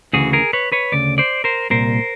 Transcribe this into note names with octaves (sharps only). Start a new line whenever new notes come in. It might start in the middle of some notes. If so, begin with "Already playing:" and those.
D2 C#3 E3 F#4 G#4
G#4 A#4
B4 C#5
B4 C#5
D2 C#3 D5
C5 D5
A#4 C5
C2 A#2 A#4 C5